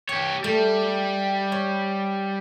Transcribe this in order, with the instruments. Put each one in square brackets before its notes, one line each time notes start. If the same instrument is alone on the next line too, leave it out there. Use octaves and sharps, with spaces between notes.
[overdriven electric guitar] G4 C#5 [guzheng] G5
[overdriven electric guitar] G3 [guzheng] A3
[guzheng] C#5